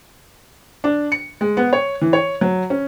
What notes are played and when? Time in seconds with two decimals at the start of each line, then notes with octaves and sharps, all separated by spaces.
0.84 D4
1.12 C#7
1.41 G#3
1.57 B3
1.73 C#5
2.02 E3
2.13 C#5
2.41 F#3
2.70 C#4